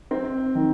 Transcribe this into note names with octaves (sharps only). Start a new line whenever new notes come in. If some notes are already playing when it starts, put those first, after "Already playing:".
C4
D#3